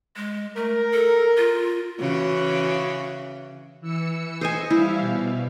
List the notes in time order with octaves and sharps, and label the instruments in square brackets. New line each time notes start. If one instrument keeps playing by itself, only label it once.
[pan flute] G#3
[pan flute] A3 [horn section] A#4
[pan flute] A4
F4
[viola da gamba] C#3 E3 F#4
[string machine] E3 E6 C#7
[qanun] C5 D#5 G#5
[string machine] G3 E5 F5 [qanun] E4
[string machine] B2